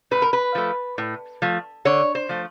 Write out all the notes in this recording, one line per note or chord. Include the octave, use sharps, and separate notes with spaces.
A2 B4
A#4
B4
F3 A3
A2
F3 A3
D3 C#5
C5
F3 A3